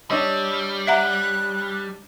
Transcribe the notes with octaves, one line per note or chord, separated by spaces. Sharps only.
G3 D4 C#5 D#5 E6
E5 F#5 A#5 F#6